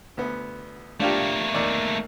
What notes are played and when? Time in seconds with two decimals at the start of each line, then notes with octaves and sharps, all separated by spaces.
0.17 D2 B3
1.00 A3 A#3 D4 F4 G4
1.54 D#2 D5